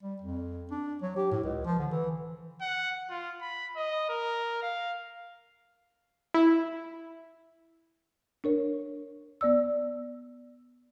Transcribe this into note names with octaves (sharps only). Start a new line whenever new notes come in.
G3
F2
D4
F#3
G4
A2
C#2
F3
D3
E3
F#5
F4
B5
D#5
A#4
F5
E4
D4 A#4 C#5
B3 D5 E6